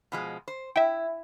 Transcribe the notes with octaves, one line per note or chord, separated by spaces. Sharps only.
B2 F3 G#3
C5
E4 E5 G5